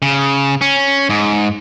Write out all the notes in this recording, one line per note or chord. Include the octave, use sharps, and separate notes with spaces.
C#3
C#4
G#2